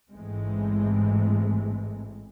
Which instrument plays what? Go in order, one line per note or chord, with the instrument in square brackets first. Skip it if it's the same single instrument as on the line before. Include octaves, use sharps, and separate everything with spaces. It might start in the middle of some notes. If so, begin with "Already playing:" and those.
[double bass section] A1 G#2 E3 G#3 A3 C4